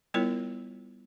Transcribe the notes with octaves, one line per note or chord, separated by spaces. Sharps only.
G3 B3 E4 F4 A#4 C#5